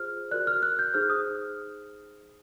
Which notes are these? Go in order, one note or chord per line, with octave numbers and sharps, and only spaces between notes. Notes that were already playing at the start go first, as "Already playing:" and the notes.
Already playing: F4 G#4 C5 F6
F#4 A#4 D5 F#6
F6
F#6
G6
D#4 G#4 C5 F6
D#6